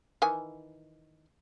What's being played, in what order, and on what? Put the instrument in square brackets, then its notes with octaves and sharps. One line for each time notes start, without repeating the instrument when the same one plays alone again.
[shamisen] D#3 E3 G#5